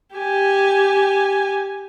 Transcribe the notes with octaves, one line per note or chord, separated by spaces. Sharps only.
G4 G#5